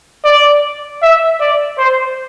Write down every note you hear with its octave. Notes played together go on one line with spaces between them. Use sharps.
D5
E5
D5
C5